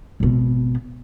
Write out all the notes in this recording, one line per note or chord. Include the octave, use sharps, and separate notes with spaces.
G#1 B2